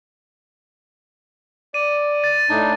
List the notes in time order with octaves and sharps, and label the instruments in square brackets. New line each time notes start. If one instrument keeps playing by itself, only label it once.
[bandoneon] D5 [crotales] D#7
[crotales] A6
[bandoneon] A2 D4 D#4